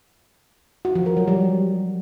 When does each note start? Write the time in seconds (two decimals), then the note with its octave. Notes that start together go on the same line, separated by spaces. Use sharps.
0.85 F#4
0.95 F3
1.06 A#4
1.17 F#3
1.27 G3